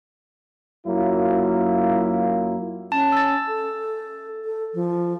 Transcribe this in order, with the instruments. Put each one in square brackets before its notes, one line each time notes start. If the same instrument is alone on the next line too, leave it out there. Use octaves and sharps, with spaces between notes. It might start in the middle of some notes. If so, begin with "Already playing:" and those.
[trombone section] F#2 F#3 A#3 E4 F4
[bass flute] C#4 [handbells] A5
[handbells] E6 A6
[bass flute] A4
A4
F3